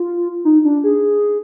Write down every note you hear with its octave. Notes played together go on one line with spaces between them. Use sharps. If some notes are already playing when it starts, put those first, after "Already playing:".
Already playing: F4
D#4
D4
G#4